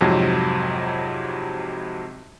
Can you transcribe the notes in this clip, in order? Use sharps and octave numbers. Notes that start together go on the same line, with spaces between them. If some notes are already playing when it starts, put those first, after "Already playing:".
F2 G#2 C3 F#3